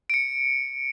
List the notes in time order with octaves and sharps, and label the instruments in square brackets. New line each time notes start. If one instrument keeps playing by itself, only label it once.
[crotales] C#7 D7